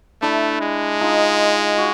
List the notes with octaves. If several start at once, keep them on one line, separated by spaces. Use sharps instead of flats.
A3 D4 E4
G#3
D#4 F4
F#4